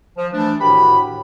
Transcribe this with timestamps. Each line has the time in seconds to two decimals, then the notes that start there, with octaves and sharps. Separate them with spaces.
0.17 F3
0.33 E3 A3 D4
0.61 A2 D#3 F#4 G4 B5